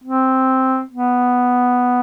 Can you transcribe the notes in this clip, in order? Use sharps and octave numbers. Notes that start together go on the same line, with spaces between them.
C4
B3